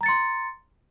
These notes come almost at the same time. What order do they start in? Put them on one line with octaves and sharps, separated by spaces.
A#5 A6 C#7 C6